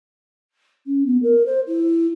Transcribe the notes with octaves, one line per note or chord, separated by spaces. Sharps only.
C#4
B3
A#4
C5
E4